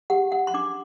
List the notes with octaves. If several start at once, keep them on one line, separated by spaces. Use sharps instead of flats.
G4 F#5
F#5
C6
D4 D6